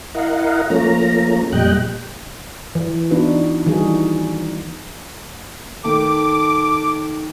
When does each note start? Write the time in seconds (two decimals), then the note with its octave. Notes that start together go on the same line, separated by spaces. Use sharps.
0.14 E4 A#4 D#5 F5 F#5
0.70 F3 A3 A#3 C#4 A#5
1.52 F2 A#2 G3 D#5 G5 F#6
2.75 E3
3.11 E3 B3 D4 D#4 F#4 B4
3.66 D#3 E3 G3 D#4 F#4 G#4
5.84 D#3 A3 A4 D6